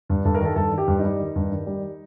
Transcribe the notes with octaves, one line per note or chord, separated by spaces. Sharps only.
G2
G2 A4
A#4
D#3 A4
G2 A4
D#3 G4
G2
D#4
G3
D#3
G2
D#3
G3